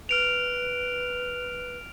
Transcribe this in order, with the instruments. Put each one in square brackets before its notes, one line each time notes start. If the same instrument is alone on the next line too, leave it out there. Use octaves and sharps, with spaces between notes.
[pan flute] B4 [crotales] F6 D7 F7